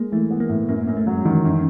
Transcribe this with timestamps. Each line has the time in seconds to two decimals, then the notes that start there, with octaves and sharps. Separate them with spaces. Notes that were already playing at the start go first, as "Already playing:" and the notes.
Already playing: G#3 A#3
0.12 E3 A3
0.30 B3
0.40 A#3
0.49 A2
0.68 F#2 A#3
0.87 F#2 A#3
0.97 A3
1.07 F#3 G#3
1.25 D#3 E3
1.45 F#2